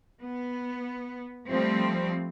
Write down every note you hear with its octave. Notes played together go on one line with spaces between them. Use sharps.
B3
F3 G3 A3 C4